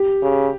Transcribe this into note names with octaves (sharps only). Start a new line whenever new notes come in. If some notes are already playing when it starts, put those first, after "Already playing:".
Already playing: G4
C#3